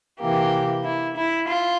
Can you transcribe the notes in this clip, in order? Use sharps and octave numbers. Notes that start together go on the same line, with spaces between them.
C3 E3 A#3 G4
E4
E4
F4